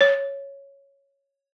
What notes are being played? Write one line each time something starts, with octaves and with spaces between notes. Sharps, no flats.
C#5